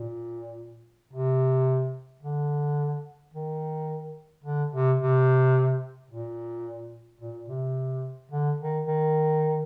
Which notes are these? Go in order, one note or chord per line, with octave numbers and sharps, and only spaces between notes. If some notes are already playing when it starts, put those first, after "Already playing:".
Already playing: A#2
C3
D3
D#3
D3
C3
C3
A#2
A#2
C3
D3
D#3
D#3